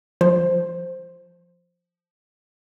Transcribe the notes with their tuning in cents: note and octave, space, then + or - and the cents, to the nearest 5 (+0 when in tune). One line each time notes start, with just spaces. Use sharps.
F3 +0 C5 +0